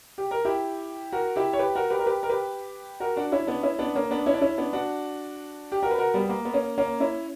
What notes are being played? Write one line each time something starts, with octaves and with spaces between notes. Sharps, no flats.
G4
A#4
E4 G4
F#4 A#4
E4 G4
C#5
G4 B4
F#4 A#4
G4 B4
A#4
G4 B4
A#4
G4 B4
F#4 A#4
D4 F#4
C#4 E4
B3 D4
C#4 E4
B3 D4
A#3 C#4
B3 D4
C#4 E4
D4
C#4 E4
B3 D4
D4 F#4
G4
F#4 A#4
B4
F#4 A#4
G3 B3
A#3
B3
A#3 C#4
A#3 C#4
C#4 E4